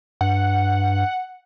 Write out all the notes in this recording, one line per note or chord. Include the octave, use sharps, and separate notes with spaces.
G2 F#5